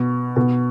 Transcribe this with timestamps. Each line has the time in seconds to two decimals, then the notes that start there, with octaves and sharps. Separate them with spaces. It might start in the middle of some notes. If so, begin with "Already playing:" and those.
Already playing: B2
0.36 B2